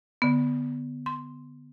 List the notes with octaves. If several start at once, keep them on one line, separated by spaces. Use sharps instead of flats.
D3 B3
C6